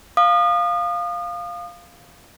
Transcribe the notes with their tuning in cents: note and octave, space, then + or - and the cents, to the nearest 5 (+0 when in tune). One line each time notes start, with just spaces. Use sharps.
F5 +0 D#6 -35